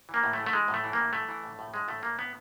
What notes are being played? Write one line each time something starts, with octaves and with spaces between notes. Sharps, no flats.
E3
A#3
A2
A3
E3
A3
E3 G#3
A2
A3
E3
A#3
A2
E3 A3
E3
A2
A2
E3 G#3
A2 A3
A2 A#3
A2 B3